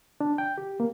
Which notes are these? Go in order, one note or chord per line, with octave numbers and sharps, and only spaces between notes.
D4
G5
G4
A#3